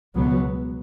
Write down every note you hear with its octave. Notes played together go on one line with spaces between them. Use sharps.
C#2 B2 F#3 B3